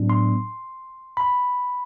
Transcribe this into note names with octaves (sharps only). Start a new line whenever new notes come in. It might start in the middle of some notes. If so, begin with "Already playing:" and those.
Already playing: A2 F#3 B3 D4
C6
B5